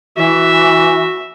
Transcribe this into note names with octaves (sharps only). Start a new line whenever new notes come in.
E3 F#4 E5